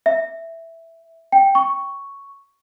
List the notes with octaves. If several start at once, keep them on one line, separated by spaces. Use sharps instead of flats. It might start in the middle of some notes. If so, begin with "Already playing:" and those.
E5
G5
C#6